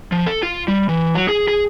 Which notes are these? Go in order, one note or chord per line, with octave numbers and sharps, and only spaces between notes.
F3
A4
F4
G3
E3
F#3
G#4
G#4